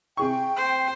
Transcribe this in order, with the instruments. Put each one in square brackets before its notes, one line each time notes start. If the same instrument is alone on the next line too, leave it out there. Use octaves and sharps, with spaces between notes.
[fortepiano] C3 G#4 C#6 [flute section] G5
[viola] C5